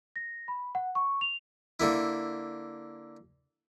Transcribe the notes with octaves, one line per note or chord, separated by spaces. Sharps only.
A#6
B5
F#5
C#6
F7
D3 A#3 E4